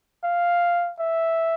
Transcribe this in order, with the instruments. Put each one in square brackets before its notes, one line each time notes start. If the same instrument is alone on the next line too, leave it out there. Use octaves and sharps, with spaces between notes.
[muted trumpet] F5
E5